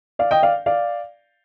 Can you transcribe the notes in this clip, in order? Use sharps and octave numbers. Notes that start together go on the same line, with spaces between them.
D5 F5
D#5 G5
D5 F5
D5 F5